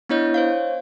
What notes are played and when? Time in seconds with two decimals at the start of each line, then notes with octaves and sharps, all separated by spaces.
0.09 B3 D4 E4 C#5 D#5 G6
0.34 C5 C#5 F5